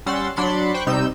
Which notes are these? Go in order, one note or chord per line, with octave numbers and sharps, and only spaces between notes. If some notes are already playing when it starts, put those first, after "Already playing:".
G3 C#4 F#5 C6 E6 A6
F#3 D4 B5 C6 A6 C#7
C5 G5 B5 C#6 F#6
C3 G3 D#4 E6 G6 E7